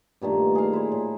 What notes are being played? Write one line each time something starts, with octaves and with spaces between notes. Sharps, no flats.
G2 A#2 D#3 A3
G#4 F5
E4 C5
A2